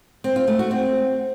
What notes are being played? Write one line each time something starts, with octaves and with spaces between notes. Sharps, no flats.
C4
F4
A3
F#4
C4